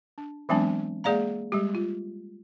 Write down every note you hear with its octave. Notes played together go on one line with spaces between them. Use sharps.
D4
E3 F#3 G#3 B3 C4 D4
G#3 A#3 G#4 D5 F5 A#5
G3 G#3 G4
F4